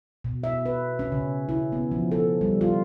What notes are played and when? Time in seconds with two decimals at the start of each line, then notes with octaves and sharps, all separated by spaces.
0.24 B2
0.44 E5
0.66 B4
0.99 C#4
1.12 C#3
1.49 E4
1.72 B3
1.91 F3
2.12 A4
2.41 G3
2.61 F4